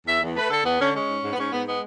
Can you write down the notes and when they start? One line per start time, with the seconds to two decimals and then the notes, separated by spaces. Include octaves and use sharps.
0.06 E2 E5
0.22 E2
0.36 A3 B4
0.50 D3 A4
0.64 E2 B3
0.79 D3 C#4
0.94 G#3 C#4
1.08 G#2
1.23 G#2
1.33 B3
1.37 G#2 C#4
1.51 G#2 B3
1.66 G#3 B3